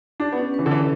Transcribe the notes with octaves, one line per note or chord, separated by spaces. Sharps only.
D4 G4
B3
C#4
E3 B4
D3
E3 A4